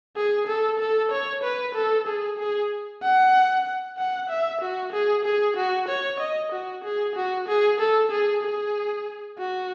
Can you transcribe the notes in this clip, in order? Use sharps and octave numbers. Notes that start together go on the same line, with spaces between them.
G#4
A4
A4
C#5
B4
A4
G#4
G#4
F#5
F#5
E5
F#4
G#4
G#4
F#4
C#5
D#5
F#4
G#4
F#4
G#4
A4
G#4
G#4
F#4